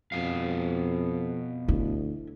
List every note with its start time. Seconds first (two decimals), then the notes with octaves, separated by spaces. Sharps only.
0.12 F2 B2 F5
1.68 D2 E4